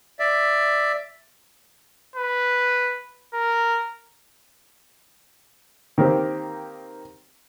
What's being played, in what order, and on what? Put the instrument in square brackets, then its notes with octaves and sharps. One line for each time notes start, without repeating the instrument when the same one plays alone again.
[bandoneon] D5 E5
[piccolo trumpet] B4
A#4
[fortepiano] D#3 A#3 C4 G4